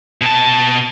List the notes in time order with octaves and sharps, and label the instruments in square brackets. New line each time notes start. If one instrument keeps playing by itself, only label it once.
[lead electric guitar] B2 A5